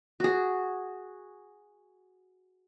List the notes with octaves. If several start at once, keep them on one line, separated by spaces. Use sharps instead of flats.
F#4 G#4